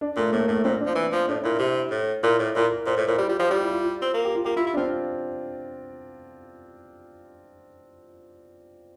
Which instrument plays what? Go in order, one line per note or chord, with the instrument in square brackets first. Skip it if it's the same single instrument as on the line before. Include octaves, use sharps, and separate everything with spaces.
[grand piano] D4
[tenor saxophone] A#2 [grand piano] A3
[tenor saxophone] A2 [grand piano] A#3
[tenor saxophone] A2 [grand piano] A3
[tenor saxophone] A#2 [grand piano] C4
[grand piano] D4
[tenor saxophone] F3
E3
F3
[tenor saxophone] A2 [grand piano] D4
[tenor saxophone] A#2 [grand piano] E4
[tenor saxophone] C3
A2
[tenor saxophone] A#2 [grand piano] E4
[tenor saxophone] A2
[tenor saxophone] A#2 [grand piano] E4
[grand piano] A#4
[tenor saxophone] A#2 [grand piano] C5
[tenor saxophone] A2
[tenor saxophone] A#2 [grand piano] E4
[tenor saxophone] G3 [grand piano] E4
[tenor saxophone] G3 [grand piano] F4
[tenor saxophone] F3 [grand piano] G4
[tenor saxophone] G3 [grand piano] F4
[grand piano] E4
F4
F4
[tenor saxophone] C4
A#3
[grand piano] G4
F4
[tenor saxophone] A#3 [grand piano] G4
[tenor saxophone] E4 [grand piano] F4
[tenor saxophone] E4
[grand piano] D4
[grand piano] C4 [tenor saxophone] F4